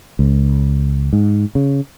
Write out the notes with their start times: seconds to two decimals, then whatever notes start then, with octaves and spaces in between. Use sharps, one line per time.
0.19 C#2
1.13 G#2
1.55 C#3